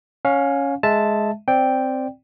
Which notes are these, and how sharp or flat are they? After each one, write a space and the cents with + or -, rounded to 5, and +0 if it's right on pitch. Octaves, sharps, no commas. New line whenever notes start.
C#4 +0 F5 +30
G#3 +10 E5 +5 A5 +0
C4 +0 D5 +0 G5 +0